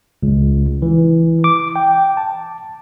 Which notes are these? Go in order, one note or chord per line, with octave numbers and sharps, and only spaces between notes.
C#2
E3
D6
G5
A5